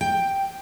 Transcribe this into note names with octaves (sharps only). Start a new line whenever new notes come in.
G5